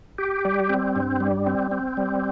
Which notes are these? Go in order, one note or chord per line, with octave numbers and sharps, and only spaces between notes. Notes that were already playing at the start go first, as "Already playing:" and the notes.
G4
G3
C4
G2
G3
C4
C4
G3